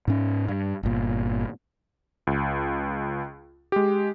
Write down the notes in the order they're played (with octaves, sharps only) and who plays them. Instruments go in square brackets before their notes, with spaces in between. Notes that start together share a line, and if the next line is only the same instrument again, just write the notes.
[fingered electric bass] G#2 C#4
G2
G1 A#2
[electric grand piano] C#2
G#3 G4